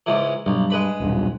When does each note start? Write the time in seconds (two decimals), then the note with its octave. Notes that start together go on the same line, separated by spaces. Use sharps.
0.06 C#2 G#2 E3
0.46 B1 G2
0.70 G#3 B4 B5
1.00 D#1 B1 G2